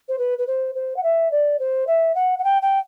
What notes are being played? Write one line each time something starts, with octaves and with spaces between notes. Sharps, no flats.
C5
B4
B4
C5
C5
F#5
E5
D5
C5
E5
F#5
F#5
G5
G5